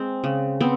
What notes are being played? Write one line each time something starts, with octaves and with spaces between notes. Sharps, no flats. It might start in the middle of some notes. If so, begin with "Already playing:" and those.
Already playing: G#3 C4
C#3
B3 C4